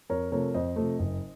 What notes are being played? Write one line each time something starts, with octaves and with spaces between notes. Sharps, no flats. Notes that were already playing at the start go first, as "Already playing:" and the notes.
F2 A#4 C#5
C3 F3 A3 A#4 C#5
F2 C5 D#5
C3 F3 A3
F#1